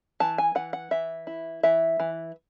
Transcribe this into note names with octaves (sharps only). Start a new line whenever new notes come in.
E3 A5
G#5
E3 F#5
F#5
E3 E5
E4
E3 E5
E3